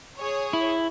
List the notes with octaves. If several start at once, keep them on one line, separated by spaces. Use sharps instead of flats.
G#4 C#5
E4